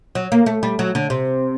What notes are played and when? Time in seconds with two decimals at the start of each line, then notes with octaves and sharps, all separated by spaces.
0.15 F#3
0.32 A#3
0.46 A3
0.63 G3
0.79 F#3
0.95 D3
1.10 C3